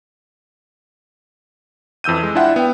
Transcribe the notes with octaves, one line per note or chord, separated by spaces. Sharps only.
F2 E3 E6 G6 D#7
G#3
D4 E4 F4 E5 F#5 G5
B3 G5